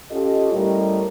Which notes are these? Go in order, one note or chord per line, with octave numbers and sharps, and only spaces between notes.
C#4 F4 G4 A4 D#5
A2 G3 C#4 G4 A#4 D#5